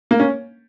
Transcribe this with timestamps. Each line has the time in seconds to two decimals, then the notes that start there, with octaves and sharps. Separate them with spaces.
0.11 A#3
0.20 C#4